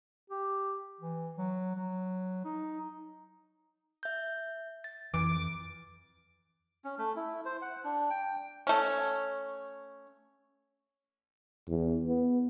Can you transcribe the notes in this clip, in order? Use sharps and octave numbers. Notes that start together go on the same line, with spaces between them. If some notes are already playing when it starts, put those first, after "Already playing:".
G4
E3
F#3
F#3
D#4
E5 G6
A6
F2 E3 D6
C#4
A3
E4
C5
F#5
D4
G5
A3 C#4
E2
B3